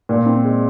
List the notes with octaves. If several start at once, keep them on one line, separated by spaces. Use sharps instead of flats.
A#2
C4
G#3